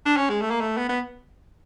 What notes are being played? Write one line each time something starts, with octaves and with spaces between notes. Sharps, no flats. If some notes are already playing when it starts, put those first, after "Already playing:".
D4
C#4
G#3
A3
A#3
A3
B3
B3